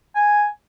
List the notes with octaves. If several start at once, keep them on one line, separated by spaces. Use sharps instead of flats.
G#5